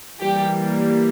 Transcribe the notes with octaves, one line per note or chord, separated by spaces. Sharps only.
E3 G3 A#3 G4